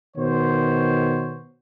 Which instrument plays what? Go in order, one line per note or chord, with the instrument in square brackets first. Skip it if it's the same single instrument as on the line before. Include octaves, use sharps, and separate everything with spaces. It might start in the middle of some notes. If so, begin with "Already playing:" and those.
[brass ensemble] B2 D#3 B3 C5 C#5